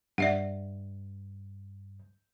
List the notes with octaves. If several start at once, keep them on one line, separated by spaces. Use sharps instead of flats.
G2 D5 E5 F#5